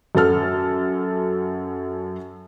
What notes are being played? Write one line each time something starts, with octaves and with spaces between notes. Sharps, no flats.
F#2 F#3 A4 F6